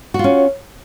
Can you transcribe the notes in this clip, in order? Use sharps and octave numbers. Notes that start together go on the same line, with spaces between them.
C#4 F4 F#4